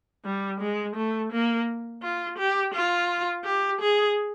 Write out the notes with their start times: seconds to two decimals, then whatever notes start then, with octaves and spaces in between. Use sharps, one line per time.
0.25 G3
0.61 G#3
0.96 A3
1.32 A#3
2.02 F4
2.38 G4
2.74 F4
3.45 G4
3.81 G#4